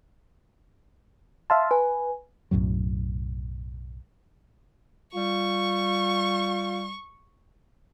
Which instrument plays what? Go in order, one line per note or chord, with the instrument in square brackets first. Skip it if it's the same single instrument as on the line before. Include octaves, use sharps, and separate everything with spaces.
[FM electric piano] E5 F5 A5 [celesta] C6
[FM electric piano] B4 [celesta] G#5
[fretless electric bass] B1 F#2 A2 F#3
[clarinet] G3 [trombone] F4 [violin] C#6